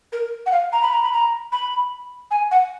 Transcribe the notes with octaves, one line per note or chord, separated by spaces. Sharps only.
A#4
F#5
F5
A#5
B5
A#5
B5
A#5
B5
G#5
F#5